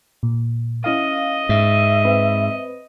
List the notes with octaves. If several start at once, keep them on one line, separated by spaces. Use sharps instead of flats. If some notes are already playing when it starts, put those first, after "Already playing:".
A#2
C#4 E4 D#5 F5
G#2 E5
C4 B4